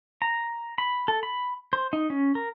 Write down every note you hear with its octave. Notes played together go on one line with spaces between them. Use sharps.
A#5
B5
A4
B5
C5
D#4
C#4
A#4